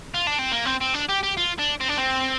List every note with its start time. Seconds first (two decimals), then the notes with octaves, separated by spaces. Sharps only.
0.14 F4
0.27 D4
0.39 C4
0.52 A#3
0.65 C4
0.81 C4
0.94 D4
1.09 G4
1.23 G4
1.37 F4
1.58 D4
1.80 C4
1.88 D4
1.97 C4